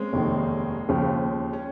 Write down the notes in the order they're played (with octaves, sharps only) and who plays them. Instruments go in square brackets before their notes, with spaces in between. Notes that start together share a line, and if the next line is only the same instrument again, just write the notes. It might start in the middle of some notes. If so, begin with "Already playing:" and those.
Already playing: [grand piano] G#3 A#3 C4 C#4
[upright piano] F1 D#2 D#3
D#2 C#3 F3
[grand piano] C#4